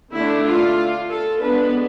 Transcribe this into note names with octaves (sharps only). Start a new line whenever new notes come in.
D3 A3 D4 E4
F4
A4
G#3 B3 D4 B4